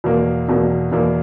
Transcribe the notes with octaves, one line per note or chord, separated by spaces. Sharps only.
E2 B2 A#3
E2 B2 A#3
E2 B2 A#3